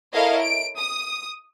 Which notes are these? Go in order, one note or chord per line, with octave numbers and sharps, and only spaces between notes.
E4 A4 A#4 C#5 D#5 F5
D7
D#6